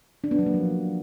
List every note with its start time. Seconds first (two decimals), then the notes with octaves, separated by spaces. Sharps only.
0.24 D4
0.31 B3
0.39 F#3
0.46 A#3
0.54 F3